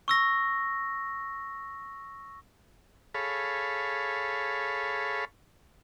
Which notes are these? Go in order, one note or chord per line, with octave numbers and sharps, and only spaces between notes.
C#6 E6 A#6
G#4 A4 C#5 F5 B5